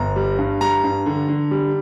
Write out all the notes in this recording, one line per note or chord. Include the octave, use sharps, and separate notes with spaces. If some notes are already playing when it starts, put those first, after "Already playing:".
Already playing: G1 A#5
G3
G2
G3 A#5
G2
D3
D3
G3